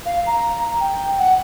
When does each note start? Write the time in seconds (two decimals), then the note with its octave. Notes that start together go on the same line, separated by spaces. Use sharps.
0.06 F5
0.26 A#5
0.80 G5
1.18 F#5